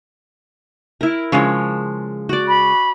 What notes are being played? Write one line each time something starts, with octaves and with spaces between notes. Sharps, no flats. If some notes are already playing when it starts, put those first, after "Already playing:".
E4 A#4
C#3 F3 G#3 C#5
F#4 D5
B5